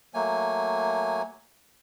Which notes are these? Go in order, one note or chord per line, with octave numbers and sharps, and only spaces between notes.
F#3 A3 A#3 G#5